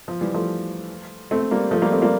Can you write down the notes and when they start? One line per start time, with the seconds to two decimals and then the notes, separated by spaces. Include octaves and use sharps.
0.08 F3
0.21 E3 G3
0.34 F3 A3
1.31 A3 C4
1.51 G3 A#3
1.71 F3 A3
1.82 G3 A#3
1.92 A3 C4
2.02 G3 A#3